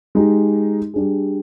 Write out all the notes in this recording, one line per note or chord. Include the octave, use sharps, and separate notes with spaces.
G#3 D#4 G4
G3 D4 G#4